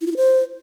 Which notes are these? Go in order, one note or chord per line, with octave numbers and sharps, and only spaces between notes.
E4
F4
E4
C5